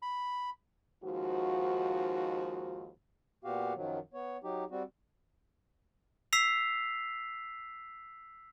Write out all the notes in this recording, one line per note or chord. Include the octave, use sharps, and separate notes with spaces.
B5
D#2 G#2 F3 F#4
A#2 B3 F#4 G4 F5
F#2 D#3 F3 F#3
B3 C#5
F#3 D#4 G4
G3 C4 F#4
E6 B6 C7 F7